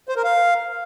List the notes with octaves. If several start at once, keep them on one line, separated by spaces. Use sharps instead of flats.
C5
A#4
F5